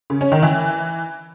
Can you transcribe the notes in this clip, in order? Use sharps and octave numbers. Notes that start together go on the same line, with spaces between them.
C#3
C#4
D#3
E3